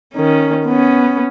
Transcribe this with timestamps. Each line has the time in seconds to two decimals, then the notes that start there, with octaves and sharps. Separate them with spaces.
0.14 D#3 C#4
0.66 B3 C#4